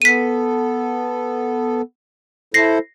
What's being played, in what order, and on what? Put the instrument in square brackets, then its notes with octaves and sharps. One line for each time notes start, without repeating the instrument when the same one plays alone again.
[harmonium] B3 A4 [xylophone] B6 D#7
[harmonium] E4 A4 C5 [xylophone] A#6 C7